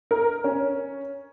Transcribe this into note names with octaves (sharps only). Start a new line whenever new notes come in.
A#4
C#4